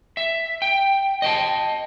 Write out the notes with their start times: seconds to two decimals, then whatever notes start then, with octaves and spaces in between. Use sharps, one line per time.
0.17 E5
0.62 G5
1.22 D#5 G5 A5